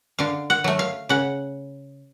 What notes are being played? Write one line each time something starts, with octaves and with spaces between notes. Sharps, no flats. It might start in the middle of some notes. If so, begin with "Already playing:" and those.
D3 F5
F#5
F#3 A3
F5
C#3 F#5